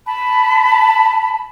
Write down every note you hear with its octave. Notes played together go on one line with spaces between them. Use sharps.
A5 B5